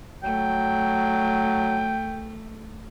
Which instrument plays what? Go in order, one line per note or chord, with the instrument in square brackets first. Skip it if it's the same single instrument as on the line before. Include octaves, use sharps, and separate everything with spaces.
[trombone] F#3 [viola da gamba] A3 [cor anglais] G5